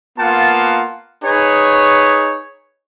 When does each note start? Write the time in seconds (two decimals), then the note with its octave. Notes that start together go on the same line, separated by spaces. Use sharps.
0.18 A#3 B3 F4 F#5 A5
1.24 D#4 G#4 B4 C#5